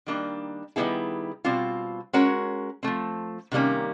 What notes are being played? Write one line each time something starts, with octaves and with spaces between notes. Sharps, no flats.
D#3 G3 A#3 D4
D#3 G3 B3 E4 G#4
B2 G3 C4 F4
G#3 C#4 F#4 A#4 C#5
F3 A3 C4
C3 D#3 G3 A#3 C#4